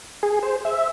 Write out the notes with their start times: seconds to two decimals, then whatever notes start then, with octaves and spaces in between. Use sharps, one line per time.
0.23 G#4
0.43 C5
0.65 E5